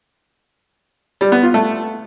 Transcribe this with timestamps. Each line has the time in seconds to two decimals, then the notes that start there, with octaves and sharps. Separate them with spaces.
1.21 G3
1.32 B3
1.43 F4
1.54 A3